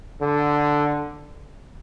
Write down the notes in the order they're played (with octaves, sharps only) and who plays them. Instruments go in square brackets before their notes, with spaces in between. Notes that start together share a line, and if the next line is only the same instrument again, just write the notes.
[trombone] D3